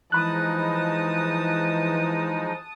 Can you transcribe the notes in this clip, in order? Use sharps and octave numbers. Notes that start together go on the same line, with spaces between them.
E3 F3 G#3 D#4 A5 B5 D#6 F#6